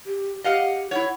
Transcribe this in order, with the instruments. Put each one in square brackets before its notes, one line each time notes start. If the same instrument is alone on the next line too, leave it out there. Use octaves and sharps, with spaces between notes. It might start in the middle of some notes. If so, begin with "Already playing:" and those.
[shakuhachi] G4
[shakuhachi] G4 [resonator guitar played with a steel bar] D#5 F5 F#5
[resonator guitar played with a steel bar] E4 C#5 [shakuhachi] F#5